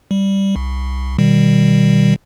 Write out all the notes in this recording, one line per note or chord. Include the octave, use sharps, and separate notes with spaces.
G3
C2
B2 D#3 G3